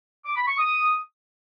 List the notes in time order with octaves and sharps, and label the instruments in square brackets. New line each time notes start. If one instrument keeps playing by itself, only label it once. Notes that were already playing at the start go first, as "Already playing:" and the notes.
[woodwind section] D6
B5
C#6
D#6